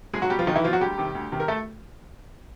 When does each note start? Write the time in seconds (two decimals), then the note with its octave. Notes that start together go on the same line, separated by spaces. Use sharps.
0.14 B1 G#3 G#4
0.22 F#3 F#4
0.30 B2 G3 G4
0.39 F3 F4
0.47 B1 D#3 D#4
0.56 E3 E4
0.64 B2 F3 F4
0.73 F#3 F#4
0.81 D2 G3 G4
0.98 C3 D#3
1.15 D2
1.32 C3 D#3
1.40 A#4
1.48 A3 A4